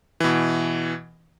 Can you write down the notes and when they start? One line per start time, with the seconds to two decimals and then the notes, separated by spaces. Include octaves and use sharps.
0.20 B2 E3